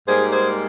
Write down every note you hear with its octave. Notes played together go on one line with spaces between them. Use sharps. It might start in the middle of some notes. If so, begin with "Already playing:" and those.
G#2 G3 A#3 G#4 C5
G#4 C5